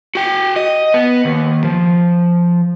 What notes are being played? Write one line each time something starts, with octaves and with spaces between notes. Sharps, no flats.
F#4 G5
D#5
B3
D#2
F3